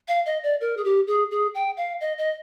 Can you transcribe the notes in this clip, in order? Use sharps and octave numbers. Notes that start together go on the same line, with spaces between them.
F5
D#5
D5
A#4
G#4
G4
G#4
G#4
G5
F5
D#5
D#5